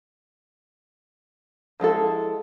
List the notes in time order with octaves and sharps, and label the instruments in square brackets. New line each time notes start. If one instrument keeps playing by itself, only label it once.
[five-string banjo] F3 G#3 E4 A4